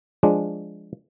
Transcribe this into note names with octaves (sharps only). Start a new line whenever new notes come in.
F3 G#3 D4